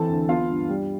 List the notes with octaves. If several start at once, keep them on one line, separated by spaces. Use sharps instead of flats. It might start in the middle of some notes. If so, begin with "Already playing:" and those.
Already playing: E3 C4 A4 A5
D2
B3 F4 F5
G2
G3